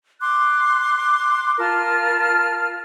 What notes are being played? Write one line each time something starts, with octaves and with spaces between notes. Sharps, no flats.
C6 D6 F#6
F4 A#4 A5 F6